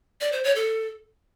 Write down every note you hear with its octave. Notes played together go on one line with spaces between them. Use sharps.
D5
C5
C#5
A4